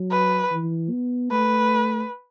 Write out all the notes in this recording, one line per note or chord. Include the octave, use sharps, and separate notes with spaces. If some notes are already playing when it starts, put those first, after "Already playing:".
Already playing: F#3
B4
E3
B3
A3 B4